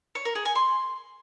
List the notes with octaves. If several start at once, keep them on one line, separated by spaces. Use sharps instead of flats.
C#5
A#4
G#4
G#5
C6